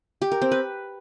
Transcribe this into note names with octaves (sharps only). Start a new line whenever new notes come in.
G4
A#4
C4
B4